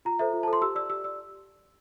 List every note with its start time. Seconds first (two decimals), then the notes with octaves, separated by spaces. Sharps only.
0.05 F4 A#5
0.19 A4 C5 E5
0.33 F4
0.43 A4 C5 A5
0.53 C6
0.61 G4 E6
0.75 D5 E6
0.89 G4 E6
1.04 D5 E6